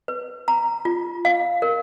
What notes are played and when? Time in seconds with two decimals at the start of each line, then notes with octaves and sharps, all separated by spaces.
0.08 B4
0.48 A#5
0.85 F4
1.25 F5
1.62 A#4